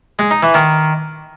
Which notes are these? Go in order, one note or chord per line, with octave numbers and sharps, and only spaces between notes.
G#3
D#4
E3
D#3